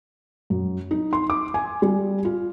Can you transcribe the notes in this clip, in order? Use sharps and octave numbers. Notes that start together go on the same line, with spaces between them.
F#2
D#4
C6
D6
G#5
G3
F4